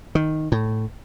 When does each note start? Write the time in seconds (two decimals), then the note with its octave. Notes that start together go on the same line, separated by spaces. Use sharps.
0.15 D#3
0.52 A2